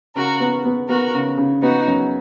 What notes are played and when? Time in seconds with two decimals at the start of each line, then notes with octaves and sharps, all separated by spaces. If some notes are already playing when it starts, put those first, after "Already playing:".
0.15 C#3 F#4 A#4
0.40 B3
0.65 B3
0.89 B3 F#4 A#4
1.14 C#3
1.38 C#3
1.62 B3 D#4 F#4
1.87 F#2